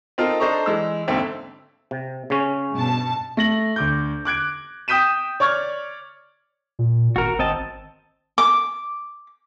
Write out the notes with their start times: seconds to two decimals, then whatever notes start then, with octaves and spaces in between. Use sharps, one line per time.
0.18 C4 D#4 F4 A4 A#4
0.40 D4 A4 C5 D#5 A#5 C#6
0.66 E3 G#3 E6
1.08 G#1 D#2 D3 C4 E5
1.91 C3
2.30 C#3 C#4
2.73 G2 B2 A5
3.37 A3 A#6 F#7
3.76 D2 D6 G6
4.25 D6 F#6 G#6 D7
4.88 G5 D#6 G6 B6 D#7 E7
5.40 C#5 D5 C#6 F6 G#6
6.79 A#2
7.16 G#1 F#4 A#4
7.39 G#1 C4 D#5 A5
8.38 D6